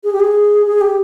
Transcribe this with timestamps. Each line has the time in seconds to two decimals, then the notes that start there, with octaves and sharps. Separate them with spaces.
0.04 G#4
0.13 G4
0.20 G#4
0.66 G#4
0.81 G4